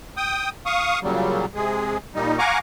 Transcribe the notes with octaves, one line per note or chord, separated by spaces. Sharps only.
G5 D#6
F5 C#6 D#6
A#2 C#3 F#3 G3
C3 G#3 G#4
A#2 G3 D#4
F5 F#5 G#5 A#5 C#6 D6